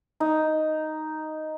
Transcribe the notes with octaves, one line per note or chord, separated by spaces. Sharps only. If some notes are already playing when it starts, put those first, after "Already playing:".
D#4